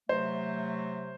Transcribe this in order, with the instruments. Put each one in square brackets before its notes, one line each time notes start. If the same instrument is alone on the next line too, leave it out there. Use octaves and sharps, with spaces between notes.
[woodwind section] C3 F#3 A3 [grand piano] C5